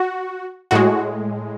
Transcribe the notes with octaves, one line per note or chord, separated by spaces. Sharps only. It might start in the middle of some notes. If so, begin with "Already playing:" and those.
Already playing: F#4
A2 G#3 F#4